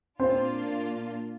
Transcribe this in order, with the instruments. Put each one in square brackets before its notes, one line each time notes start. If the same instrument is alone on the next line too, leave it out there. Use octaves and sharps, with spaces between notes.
[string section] A#2 A#3 D4 F4 [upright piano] C4